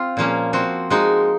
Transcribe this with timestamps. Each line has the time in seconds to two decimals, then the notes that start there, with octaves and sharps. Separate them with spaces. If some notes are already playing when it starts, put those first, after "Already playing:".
Already playing: C4 F4
0.17 A#2 F3 A#3 C#4
0.53 F3 C4 F#4
0.90 F3 G#3 D#4 F#4